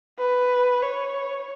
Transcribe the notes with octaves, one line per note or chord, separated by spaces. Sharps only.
B4
C#5